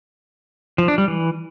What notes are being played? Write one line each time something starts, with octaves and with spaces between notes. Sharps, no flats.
F3
D4
G3
E3